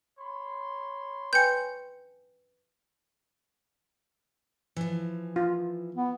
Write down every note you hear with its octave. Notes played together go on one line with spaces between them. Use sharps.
C#5 B5 C6
B4 G5 G#5 G6 C#7
E3 F3
F4
B3